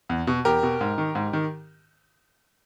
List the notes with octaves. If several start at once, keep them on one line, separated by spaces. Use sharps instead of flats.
E2
B2
E2 G4 A#4
B2
G#2
D#3
G#2
D#3